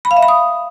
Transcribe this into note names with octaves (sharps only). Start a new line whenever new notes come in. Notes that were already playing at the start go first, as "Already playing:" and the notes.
B5
F5
E5
B5
D#6